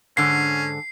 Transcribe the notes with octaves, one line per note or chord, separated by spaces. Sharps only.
G#2 D3 C#4 C7